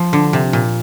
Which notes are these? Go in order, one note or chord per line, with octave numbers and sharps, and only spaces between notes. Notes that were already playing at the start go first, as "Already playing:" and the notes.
Already playing: F3
D3
C3
A#2